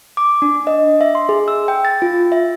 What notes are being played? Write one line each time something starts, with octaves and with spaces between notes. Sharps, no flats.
D6
D4
D#5
E5
C6
G#4
E6
G5
A6
F4
E5